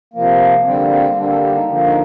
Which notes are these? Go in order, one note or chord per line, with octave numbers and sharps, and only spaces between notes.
C3 F3 A#3
D3 G3 A#3 C4
C4
D3 G3 A#3 D4
A4
G4
D#4
D3 F3 A#3
D#4